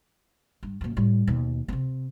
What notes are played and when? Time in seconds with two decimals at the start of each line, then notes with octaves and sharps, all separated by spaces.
0.63 G2
0.81 F#2 A#2
0.96 A2 G3
1.27 D#2 B2
1.68 C3 C4